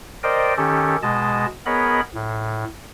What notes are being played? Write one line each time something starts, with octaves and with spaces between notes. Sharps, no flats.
A#4 C5 D5 D#5 G5
D#3 C#4 G4 A4
B2 G#3 D#5 A5
B3 G#4 A#4 C#5 D#5 B5
A2